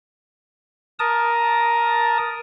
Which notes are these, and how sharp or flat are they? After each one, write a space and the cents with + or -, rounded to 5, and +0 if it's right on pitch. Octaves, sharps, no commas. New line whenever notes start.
A#4 +10 A5 +0 D#6 +0